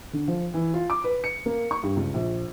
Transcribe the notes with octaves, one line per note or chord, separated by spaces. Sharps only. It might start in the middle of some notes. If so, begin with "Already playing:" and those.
D3
F3
E3
F4
D6
B4
C#7
A#3
C#6
G2
C#2
A#1